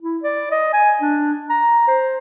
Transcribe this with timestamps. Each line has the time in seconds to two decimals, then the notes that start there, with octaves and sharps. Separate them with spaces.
0.02 E4
0.23 D5
0.51 D#5
0.73 G#5
1.02 D4
1.50 A#5
1.88 C5